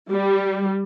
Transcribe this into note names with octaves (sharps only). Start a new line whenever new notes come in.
G3